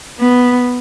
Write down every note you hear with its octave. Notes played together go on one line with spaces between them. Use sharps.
B3